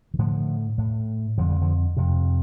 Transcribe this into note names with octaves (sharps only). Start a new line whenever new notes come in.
D#3
A2 D3 F3
A2
F2 D3 F3
G3
D3 F3
F2 C3